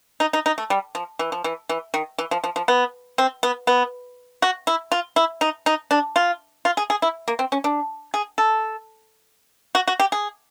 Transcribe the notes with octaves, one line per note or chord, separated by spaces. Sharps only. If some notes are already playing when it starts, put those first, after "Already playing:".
D#4
D#4
D#4
A3
G3
F3
E3
F3
E3
E3
D#3
E3
F3
F3
F3
B3
C4
B3
B3
F#4
E4
F4
E4
D#4
D#4
D4
F4
F4
G#4
G#4
E4
A#3
C4
C#4
D4
G#4
A4
F#4
F#4
G4
G#4